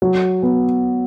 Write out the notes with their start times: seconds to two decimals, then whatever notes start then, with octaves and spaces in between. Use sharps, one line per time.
0.02 F#3
0.43 B3